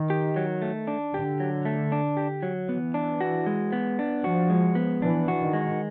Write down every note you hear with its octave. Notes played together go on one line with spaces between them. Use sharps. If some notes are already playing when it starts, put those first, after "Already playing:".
Already playing: D#3
G4
F#3
A3
D4
D3 G4
F#3
A3
D4
G4
F#3
E3 B3
D4
F#4
G#3
B3
D4
F3 F#4
G#3
B3
E3 D4
F#4
D#3
G#3